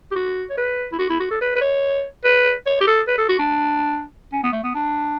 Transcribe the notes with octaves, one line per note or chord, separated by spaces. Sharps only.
G4
F#4
C#5
B4
E4
F#4
E4
F#4
A4
B4
B4
C#5
B4
C#5
G4
A4
B4
A4
F#4
D4
C#4
B3
A3
B3
D4